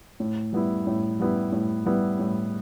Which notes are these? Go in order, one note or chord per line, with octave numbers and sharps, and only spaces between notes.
A2
G3 B3 E4
A2
G3 B3 E4
A2
G3 B3 E4
A2